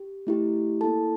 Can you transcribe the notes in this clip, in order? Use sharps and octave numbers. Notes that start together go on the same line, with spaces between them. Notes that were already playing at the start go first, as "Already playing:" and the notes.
Already playing: G4
A3 E4 G4
A#3 E4 A4 A5